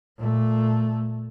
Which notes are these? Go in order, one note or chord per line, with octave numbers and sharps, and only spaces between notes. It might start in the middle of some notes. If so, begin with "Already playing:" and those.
A#2 A3